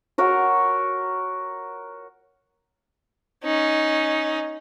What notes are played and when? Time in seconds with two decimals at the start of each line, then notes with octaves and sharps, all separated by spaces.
0.18 F#4 A#4 C#5
3.44 C#4 D#4